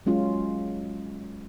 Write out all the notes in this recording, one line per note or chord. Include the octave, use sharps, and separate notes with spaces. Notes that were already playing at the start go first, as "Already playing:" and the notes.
F#3 G#3 C#4 F4